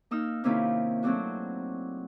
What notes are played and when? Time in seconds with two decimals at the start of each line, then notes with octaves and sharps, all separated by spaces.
0.11 A#3 D#4 E6 F6
0.44 C3 D#3 A#3 C#4 E4 F4
1.03 F#3 A3 C4 D4 F#4